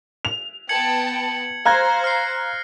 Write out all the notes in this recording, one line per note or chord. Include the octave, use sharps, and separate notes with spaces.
F7
B3 G5 A5 G#6 C#7 F#7
C5 F5 A#5 F6 F#6 G#6 A#6
F6 C7